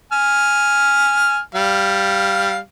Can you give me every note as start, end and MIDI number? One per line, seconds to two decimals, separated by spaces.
0.12 1.39 80
0.12 1.39 89
1.55 2.57 55
1.55 2.57 77